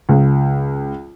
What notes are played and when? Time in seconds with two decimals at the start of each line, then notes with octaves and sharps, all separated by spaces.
0.09 C#2